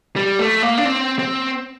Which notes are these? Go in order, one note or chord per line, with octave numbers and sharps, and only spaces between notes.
G3
A3
A#3
D4
C4
C4